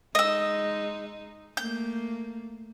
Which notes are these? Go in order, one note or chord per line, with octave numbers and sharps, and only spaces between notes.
G#3 D#4 D#5 E6
A3 A#3 G6